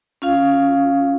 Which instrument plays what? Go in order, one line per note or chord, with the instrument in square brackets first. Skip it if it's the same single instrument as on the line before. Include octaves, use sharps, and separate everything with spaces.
[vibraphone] C#4 F4 F5